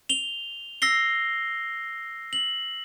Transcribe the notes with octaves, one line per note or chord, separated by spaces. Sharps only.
F7 G7
E6 A#6 C7 G7
F#7